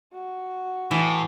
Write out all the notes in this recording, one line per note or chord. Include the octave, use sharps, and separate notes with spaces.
F#4
A2 E3